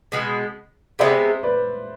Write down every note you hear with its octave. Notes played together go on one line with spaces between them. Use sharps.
B2 G#3 B3
C3 G#3 B3 C5 E5
B4 D5